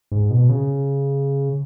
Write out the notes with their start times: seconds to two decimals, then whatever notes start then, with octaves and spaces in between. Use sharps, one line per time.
0.12 G#2
0.31 B2
0.49 C#3